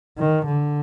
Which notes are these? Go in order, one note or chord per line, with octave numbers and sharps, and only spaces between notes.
D#3
D3